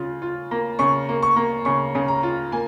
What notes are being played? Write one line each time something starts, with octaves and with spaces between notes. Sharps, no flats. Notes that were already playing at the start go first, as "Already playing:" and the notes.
Already playing: C#3 F4
F4
A#3
C#3 C#6
A#3
C#6
A#3
C#3 C#6
C#3
A#5
F4
A#3 G#5